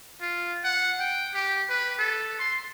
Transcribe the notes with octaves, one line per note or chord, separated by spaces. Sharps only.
F4
F#5
G5
G4
B4
A4
C6